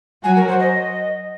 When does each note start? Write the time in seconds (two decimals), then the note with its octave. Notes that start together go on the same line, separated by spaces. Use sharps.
0.24 F#3 F#4 G#5
0.36 A#4
0.48 C5
0.60 D#5